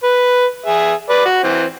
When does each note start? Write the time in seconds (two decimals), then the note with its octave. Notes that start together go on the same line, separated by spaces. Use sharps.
0.03 B4
0.66 G#4 E5
1.09 B4 D5
1.25 F#4
1.44 E3 C4